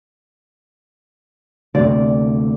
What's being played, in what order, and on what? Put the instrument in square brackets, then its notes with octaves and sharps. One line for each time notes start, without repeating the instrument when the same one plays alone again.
[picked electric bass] D2 C3 [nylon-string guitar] D5